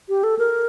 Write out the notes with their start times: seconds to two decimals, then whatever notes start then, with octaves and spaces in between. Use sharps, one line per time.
0.09 G4
0.24 A4
0.39 A#4